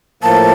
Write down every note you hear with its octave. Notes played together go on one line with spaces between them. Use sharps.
A2 F3 A#3 A5